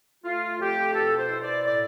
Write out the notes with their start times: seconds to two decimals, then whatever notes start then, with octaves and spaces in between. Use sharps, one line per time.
0.24 A3 F4
0.59 F2 G4
0.94 B2 A4
1.17 C5
1.29 E4
1.41 D5
1.64 A2 D5